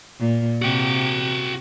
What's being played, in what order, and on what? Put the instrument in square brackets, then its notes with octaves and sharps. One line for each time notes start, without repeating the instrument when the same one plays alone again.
[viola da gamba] A#2
[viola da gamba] C3 [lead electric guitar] F#4 G5